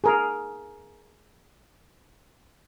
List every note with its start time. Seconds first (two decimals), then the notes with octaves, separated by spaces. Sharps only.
0.04 G#4 A#4